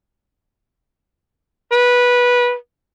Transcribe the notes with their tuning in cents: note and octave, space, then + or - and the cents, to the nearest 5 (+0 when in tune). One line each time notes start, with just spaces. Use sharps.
B4 -15